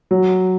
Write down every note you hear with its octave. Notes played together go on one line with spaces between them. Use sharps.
F#3